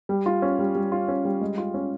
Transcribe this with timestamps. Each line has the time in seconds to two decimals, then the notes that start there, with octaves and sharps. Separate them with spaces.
0.09 G3
0.26 F4
0.42 C#4
0.59 G3
0.75 G3
0.92 F4
1.08 C#4
1.25 G3
1.41 G#3
1.58 F4
1.74 C#4